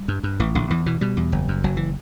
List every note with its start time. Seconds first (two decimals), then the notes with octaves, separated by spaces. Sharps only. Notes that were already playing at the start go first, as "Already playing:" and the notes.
Already playing: G3
0.08 G2
0.23 G2
0.40 A1 E3
0.55 A1 D3
0.70 E2 E3
0.86 B2 E3
1.01 B2 G3
1.17 E2
1.32 F#1
1.48 F#2
1.64 F#1 F#3
1.77 E3